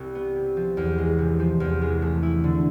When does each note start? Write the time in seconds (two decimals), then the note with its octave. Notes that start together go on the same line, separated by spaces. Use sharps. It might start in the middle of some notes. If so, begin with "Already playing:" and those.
Already playing: C2
0.15 B3
0.36 C3
0.57 F3
0.77 E2
0.98 G#3
1.18 C3
1.40 F3
1.60 E2
1.81 G#3
2.02 A3
2.23 E4
2.44 D3